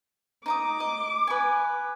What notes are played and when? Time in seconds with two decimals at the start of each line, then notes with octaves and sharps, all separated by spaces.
0.46 D#4 A#5 D6 D#6
0.80 D#5
1.27 B4 G#5